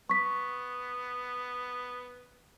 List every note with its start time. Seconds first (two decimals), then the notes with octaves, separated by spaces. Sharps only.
0.10 B3 C#6 B6